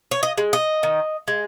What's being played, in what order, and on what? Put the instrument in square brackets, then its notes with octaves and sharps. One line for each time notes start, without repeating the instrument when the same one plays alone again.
[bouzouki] C#5
D#5
G#3
D#5
D#3
G#3